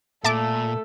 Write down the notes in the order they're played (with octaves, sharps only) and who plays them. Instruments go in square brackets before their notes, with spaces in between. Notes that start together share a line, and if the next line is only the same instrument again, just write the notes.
[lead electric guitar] A#2 [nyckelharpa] A3 [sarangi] A4 [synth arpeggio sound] E5 A5 D6